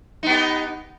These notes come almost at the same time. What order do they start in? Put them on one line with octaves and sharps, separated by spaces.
D#4 B3 G4